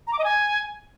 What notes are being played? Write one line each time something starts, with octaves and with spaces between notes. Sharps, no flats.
A#5
D6
D#5
G#5